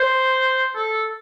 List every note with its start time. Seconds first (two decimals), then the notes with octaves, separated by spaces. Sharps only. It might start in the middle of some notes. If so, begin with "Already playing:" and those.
Already playing: C5
0.76 A4